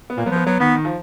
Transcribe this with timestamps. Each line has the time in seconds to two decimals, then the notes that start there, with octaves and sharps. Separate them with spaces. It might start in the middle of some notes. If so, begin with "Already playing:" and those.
0.10 B3
0.17 A#2 A#3
0.26 F#3 B3
0.31 F3
0.36 B3
0.46 F#3 B3
0.60 D#3 B3
0.75 D#3
0.85 F3